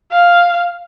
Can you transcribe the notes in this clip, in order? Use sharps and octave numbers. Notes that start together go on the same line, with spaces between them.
F5